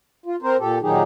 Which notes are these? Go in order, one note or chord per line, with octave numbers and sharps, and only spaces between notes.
F4
C4 A#4 C5
A#2 G4 A4
A#2 D#3 F#3 D#4 G4 G#4